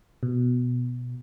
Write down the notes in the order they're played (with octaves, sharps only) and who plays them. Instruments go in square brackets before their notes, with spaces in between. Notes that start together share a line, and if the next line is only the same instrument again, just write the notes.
[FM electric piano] B2